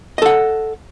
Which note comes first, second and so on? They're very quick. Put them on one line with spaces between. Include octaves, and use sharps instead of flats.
D#5 A4 F#5